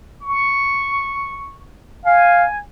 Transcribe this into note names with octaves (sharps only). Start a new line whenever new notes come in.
C#6
F5 G#5